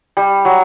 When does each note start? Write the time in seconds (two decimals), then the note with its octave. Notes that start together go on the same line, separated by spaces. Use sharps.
0.17 G3
0.45 F#3